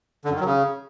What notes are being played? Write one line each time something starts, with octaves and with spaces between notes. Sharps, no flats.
D3
F#2
D#3
F#3
C#3